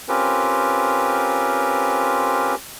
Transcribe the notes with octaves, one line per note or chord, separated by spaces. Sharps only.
C4 C#4 F4 G4 A#4 B4